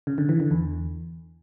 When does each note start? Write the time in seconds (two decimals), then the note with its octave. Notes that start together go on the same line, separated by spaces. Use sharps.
0.07 C#3
0.18 D3
0.29 E3
0.40 D3
0.51 E2